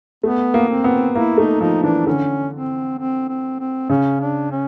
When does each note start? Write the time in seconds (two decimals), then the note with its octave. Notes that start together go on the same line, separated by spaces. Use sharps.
0.23 A3 B3
0.54 A#3
0.69 C4
0.84 B3
1.15 A#3 E4
1.38 A3 D#4
1.61 F3 D#4
1.83 E3 D4
2.06 D3 C#4
2.53 C4
2.99 C4
3.29 C4
3.60 C4
3.90 C#3 C#4
4.21 D4
4.51 C#4